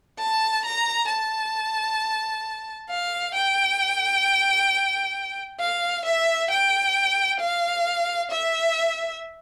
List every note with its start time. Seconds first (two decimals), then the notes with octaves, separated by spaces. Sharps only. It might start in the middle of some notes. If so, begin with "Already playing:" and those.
0.19 A5
0.65 A#5
1.09 A5
2.90 F5
3.35 G5
5.60 F5
6.05 E5
6.51 G5
7.40 F5
8.31 E5